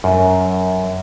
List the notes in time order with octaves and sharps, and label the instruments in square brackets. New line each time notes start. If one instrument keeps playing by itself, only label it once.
[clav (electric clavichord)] F#2